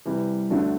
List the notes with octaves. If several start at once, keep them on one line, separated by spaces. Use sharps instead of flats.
C3 E3 G3
D2 D3 F#3 A3 D4